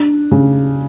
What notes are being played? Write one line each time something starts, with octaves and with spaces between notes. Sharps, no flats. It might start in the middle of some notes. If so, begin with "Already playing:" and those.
Already playing: D4
C#3